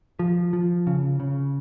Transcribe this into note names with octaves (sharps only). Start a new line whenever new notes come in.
F3
F3
C#3
C#3